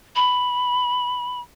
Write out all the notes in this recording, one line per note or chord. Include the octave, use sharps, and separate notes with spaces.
B5